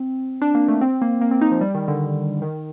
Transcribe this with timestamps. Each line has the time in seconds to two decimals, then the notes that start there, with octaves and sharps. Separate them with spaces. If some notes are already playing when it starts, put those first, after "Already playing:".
Already playing: C4
0.42 D4
0.55 A#3
0.68 A3
0.81 C4
1.02 A#3
1.21 A#3
1.31 C4
1.41 D#4
1.52 F3
1.61 G3
1.75 D#3
1.88 D3
2.42 D#3